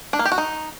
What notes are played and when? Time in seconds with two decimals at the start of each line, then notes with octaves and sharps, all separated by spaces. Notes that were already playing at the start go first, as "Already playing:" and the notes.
0.13 D4
0.19 A#3
0.25 G4
0.32 F#4
0.38 D#4